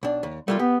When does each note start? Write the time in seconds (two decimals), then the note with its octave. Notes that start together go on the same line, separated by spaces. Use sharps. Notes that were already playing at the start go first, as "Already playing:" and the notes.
0.03 B1 D4
0.23 D#2
0.48 G3 A3 A#3 F4
0.59 B3 G4